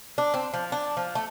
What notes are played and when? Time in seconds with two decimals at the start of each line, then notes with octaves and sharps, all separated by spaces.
0.18 D4
0.34 C4
0.54 F3
0.72 D4
0.97 F3
1.15 A3